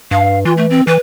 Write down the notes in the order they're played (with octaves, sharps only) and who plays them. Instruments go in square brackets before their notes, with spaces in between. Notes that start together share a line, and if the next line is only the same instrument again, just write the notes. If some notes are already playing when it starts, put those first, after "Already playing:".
[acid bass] G2 [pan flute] F5
[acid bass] E3 [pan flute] F4
[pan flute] A3
C4
[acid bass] E3 [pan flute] B4